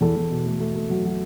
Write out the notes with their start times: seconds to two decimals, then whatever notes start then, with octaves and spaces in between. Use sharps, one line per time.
0.01 E2 A4
0.16 E2
0.30 B2
0.46 A3
0.60 A3
0.75 A3
0.90 F#3
1.05 F#3